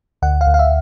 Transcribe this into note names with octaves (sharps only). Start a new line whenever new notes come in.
D2 F#5
F5
D2
F5
E5